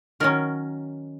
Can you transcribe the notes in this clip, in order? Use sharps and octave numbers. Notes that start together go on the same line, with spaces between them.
D#3 F#3 C#4 A#4